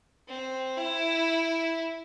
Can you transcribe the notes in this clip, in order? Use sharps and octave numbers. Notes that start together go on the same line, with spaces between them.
C4
E4